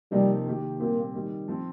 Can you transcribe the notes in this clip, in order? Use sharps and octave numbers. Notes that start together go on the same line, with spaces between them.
C3 F3 G3 A#3 D#4 G4
D#3 A#3 G4
A#2 G3 A#3 C4 G4
D#3 G3 D#4
F3 C4